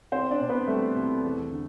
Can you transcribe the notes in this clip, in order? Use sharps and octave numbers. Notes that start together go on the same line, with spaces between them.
C2 C4 C5
D4 D5
B2
B3 B4
G3 A3 A4
C2
E2
D3